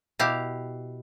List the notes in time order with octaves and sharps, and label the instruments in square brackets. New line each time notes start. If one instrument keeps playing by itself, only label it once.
[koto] B2 E4 G4 F5